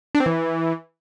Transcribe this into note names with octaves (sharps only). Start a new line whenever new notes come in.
D4
C4
E3